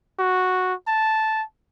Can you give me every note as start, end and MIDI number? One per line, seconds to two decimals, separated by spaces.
0.19 0.74 66
0.88 1.43 81